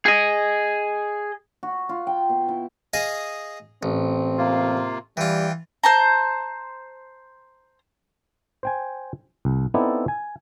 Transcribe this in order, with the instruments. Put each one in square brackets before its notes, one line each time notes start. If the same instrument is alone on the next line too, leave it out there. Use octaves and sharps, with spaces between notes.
[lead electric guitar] G#4 D#5
[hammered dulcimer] F#4
F4
G5
B2
E4
[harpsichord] G#4 D#5 F5
[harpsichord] A1 [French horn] C4
[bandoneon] C3 A#3 F4
[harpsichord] E3 F4 [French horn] G3 [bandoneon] G5
[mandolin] C5 A5 A#5
[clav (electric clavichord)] C5 G5 G#5
C2
B3 C4 D#4 E4 A4 D5
G#5